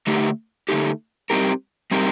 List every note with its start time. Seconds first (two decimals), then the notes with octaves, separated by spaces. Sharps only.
0.07 D3 A3 D#4 G4
0.69 D3 A3 D#4 G4
1.30 G3 C4 D#4 G4 A#4
1.91 G3 C4 D#4 G4 A#4